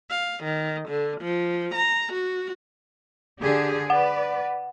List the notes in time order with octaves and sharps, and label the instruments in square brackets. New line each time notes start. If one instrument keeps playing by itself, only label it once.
[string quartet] F5
D#3
D3
F3
A#5
F#4
[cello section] D3 G4 G#4
[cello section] B4 D5 [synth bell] F#5